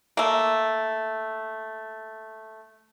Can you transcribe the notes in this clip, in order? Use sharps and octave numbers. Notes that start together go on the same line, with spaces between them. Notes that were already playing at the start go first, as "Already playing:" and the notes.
A3 A#3